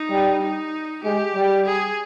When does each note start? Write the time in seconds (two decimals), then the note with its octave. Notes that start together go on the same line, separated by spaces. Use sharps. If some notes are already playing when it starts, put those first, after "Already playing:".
Already playing: D#4
0.11 G3
0.42 D#4
1.04 G#3 G4
1.35 G3
1.66 G#4